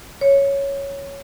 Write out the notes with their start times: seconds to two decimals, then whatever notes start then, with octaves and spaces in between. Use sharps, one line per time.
0.21 C#5